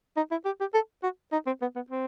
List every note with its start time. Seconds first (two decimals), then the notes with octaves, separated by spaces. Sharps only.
0.17 D#4
0.31 E4
0.45 G4
0.60 G4
0.74 A4
1.03 F#4
1.32 D#4
1.46 C4
1.62 B3
1.76 B3
1.90 C4